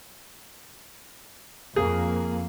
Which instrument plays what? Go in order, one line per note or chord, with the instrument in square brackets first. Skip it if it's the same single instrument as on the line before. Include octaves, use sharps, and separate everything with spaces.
[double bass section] F2 A#3 [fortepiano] G#4